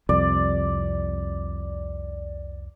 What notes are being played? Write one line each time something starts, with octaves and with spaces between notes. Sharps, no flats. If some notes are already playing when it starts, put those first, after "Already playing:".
C2 F2 D5